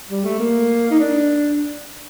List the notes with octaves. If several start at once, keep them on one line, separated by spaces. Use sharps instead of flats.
G3
A3
A#3
D#4
D4